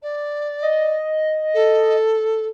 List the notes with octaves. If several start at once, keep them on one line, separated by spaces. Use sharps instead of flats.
D5
D#5
A4